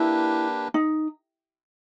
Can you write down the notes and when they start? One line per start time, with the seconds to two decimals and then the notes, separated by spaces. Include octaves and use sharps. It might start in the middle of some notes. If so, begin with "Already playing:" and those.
Already playing: A#3 D4 E4 G4 B4
0.74 D#4